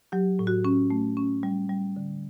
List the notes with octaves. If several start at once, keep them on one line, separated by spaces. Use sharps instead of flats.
F#3 G4
A2
F#4
C#4
A3
C#4
G3
G3
D3